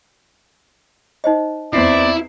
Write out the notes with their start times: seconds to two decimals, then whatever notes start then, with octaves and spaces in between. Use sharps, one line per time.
1.24 D#4 C5 D#5
1.73 E2 C4 E4 D5 C7